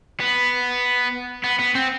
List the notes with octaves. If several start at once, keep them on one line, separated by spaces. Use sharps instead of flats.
B3
B3
B3
C4